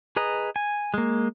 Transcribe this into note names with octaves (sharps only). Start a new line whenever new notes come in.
G#4 B4 D#5 A#5
G#5
G#3 A#3